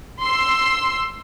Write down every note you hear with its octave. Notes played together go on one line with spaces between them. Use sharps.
C6 E6